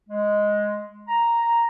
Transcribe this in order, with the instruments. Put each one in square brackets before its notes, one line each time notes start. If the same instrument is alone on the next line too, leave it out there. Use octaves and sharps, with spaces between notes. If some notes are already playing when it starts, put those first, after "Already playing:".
[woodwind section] G#3
A#5